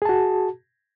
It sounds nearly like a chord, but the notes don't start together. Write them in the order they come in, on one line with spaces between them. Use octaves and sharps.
G#4 A5 F#4